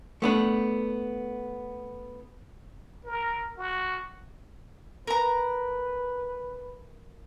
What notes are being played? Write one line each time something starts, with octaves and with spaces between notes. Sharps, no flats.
A3 B3 D4
A#4
F#4
A#4 B4 A#5